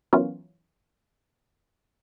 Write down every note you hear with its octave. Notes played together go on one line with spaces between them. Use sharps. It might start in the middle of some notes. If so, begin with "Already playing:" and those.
E3 F#3 B3 C#4 F4 A#4